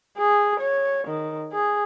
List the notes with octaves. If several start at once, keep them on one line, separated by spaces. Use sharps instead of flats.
G#4
C#5
D#3
G#4